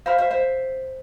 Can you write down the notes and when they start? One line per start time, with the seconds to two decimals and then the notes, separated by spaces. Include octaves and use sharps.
0.06 C5 E5 F5 B5 F6
0.18 C5 E5
0.30 C5 E5